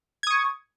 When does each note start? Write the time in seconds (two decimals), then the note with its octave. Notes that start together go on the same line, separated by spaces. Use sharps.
0.23 G#6
0.27 D#6
0.31 C#6